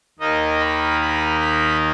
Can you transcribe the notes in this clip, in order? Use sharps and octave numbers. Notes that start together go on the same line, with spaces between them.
D#2 D#3 A#3 D#4 D#5
B5
B5
B5